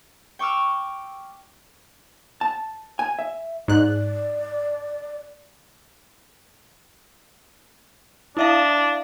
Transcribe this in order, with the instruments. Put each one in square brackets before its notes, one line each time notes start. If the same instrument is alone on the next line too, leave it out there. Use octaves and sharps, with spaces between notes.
[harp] G5 C#6 D6 E6 F6
[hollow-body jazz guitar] A5
G#5
E5
[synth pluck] G#2 F#6 [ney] D5
[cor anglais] D4 [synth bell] E4 E5 F5